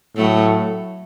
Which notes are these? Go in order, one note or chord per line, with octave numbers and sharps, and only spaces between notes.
A2 F#3 A3